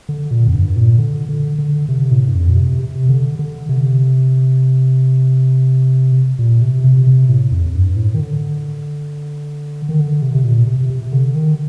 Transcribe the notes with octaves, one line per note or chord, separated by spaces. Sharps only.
D3
A#2
F2
G2
A#2
D3
D3
D3
C3
A2
G2
F2
A#2
C3
C3
D3
D3
C3
A#2
C3
C3
C3
A2
F2
F2
G2
A2
D#3
D3
D#3
D3
C3
C3
A#2
C3
C3
D3
D#3